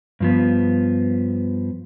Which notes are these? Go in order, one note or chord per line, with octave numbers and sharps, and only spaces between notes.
G2 F3 B3